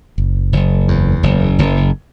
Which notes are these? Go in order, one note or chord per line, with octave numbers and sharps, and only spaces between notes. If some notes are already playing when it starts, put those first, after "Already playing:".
F#1
F#1
E2
F#1
F#1